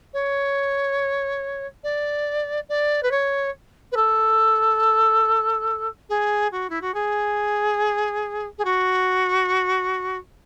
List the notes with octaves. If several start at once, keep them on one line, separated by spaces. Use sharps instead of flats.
C#5
D5
D5
B4
C#5
B4
A4
G#4
F#4
E4
F#4
G#4
G#4
F#4